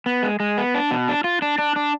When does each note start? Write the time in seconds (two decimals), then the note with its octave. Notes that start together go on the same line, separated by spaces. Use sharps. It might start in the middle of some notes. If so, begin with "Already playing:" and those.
0.06 B3
0.23 G#3
0.40 G#3
0.58 B3
0.74 D4
0.91 B2
1.08 D4
1.24 F4
1.42 D4
1.58 D4
1.76 D4